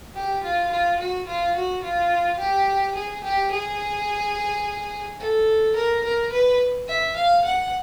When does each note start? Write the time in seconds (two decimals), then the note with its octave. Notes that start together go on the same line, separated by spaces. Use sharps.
0.15 G4
0.43 F4
0.71 F4
0.99 F#4
1.27 F4
1.55 F#4
1.83 F4
2.39 G4
2.95 G#4
3.23 G4
3.51 G#4
5.20 A4
5.75 A#4
6.04 A#4
6.32 B4
6.88 E5
7.16 F5
7.44 F#5